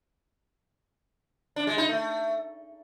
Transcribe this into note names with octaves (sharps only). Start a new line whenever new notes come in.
D4
G#3
D#4
A3